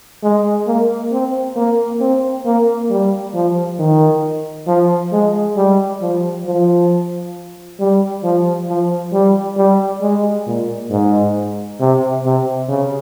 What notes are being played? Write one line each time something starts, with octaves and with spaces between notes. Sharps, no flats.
G#3
A#3
C4
A#3
C4
A#3
G3
F3
D#3
F3
G#3
G3
F3
F3
G3
F3
F3
G3
G3
G#3
A#2
G#2
C3
C3
C#3